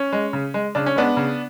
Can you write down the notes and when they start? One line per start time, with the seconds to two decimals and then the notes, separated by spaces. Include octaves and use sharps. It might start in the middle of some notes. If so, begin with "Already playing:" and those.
Already playing: C#4
0.13 G#3
0.33 C#3
0.54 G#3
0.75 C#3 D4
0.86 C#4
0.96 G#3 B3 D4
1.17 C#3